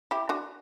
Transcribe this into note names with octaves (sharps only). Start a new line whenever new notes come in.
E4 G4
D4 F#4